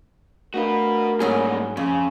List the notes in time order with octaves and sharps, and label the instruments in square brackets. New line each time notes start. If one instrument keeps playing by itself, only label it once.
[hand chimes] A3 D4 F5 [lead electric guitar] F#4 B4 [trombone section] A#4
[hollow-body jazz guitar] G#2 F#3 G#4 [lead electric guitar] G3 A#3
[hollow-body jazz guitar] F2 [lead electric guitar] C#3 [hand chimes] G#5 C6